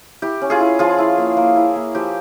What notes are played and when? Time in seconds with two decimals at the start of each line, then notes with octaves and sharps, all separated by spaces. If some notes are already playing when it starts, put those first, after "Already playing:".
0.22 E4 G4
0.41 C#4
0.50 F4 G#4
0.60 E4
0.79 F3 F4 G#4
0.98 E4
1.18 A#3
1.37 A#3
1.56 E4
1.76 A#3
1.95 F3 G4